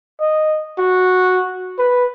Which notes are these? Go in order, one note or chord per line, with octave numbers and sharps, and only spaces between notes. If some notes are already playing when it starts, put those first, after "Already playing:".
D#5
F#4
B4